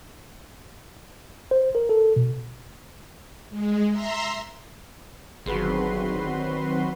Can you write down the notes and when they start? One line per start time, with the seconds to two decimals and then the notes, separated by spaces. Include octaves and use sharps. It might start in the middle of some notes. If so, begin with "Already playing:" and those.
1.51 C5
1.75 A#4
1.89 A4
2.16 B2
3.50 G#3
3.91 E5 A#5 C6
5.46 G1 D#3 F#3 C4 F#4 G#4 B4 C6